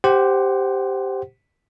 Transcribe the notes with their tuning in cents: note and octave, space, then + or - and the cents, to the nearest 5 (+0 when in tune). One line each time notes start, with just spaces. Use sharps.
G4 +0 C5 +0 F#5 +25